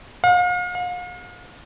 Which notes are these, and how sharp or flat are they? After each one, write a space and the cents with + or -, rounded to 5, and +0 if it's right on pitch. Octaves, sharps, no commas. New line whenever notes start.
F5 +40
F5 +40